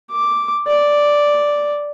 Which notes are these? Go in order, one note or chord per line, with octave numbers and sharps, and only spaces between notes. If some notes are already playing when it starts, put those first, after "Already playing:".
D6
D5